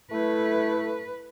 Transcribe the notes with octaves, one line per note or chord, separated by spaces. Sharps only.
A3 E4 B4